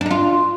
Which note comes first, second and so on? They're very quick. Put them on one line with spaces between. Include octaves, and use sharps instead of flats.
D4 D#4 F4